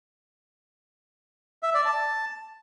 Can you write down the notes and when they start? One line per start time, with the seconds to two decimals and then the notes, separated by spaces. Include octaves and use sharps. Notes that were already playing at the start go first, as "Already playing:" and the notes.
1.63 E5
1.74 D5
1.85 A5